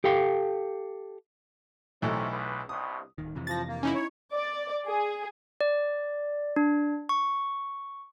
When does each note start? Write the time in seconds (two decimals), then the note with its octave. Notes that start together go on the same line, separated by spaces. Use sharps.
0.04 G4 A4 F5 G5
2.02 B1 C3 D#3 E3 A3 C#4
2.31 C#2 B4
2.69 C2 G2 B2 D#6
3.18 D1 D#3
3.35 F2 C3 E3
3.47 F3 A6 A#6
3.68 A#3
3.83 C#4 D#4 E4
3.94 C#5
4.33 D5
4.87 G#4
5.61 D5
6.56 D4
7.09 C#6